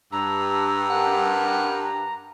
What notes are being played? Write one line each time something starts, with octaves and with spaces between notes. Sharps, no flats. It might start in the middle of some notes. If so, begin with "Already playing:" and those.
G2 A#5 E6
A#4 F#5
A#5